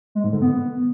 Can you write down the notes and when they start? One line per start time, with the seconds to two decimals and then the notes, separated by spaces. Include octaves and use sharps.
0.15 G#3
0.24 G#2
0.33 D3
0.42 B3